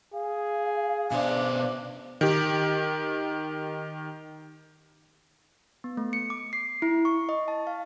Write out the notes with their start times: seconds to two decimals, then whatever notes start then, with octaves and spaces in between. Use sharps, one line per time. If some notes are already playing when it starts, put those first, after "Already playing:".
0.13 G#4 F5
1.11 B2 D4 C5
2.21 D#3 G4
5.84 B3
5.97 A3
6.13 C#7
6.30 D6
6.53 C7
6.82 E4
7.05 C#6
7.29 D#5
7.48 A5
7.67 F5